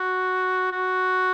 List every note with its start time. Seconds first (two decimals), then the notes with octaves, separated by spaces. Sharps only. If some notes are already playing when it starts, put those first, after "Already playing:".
Already playing: F#4
0.72 F#4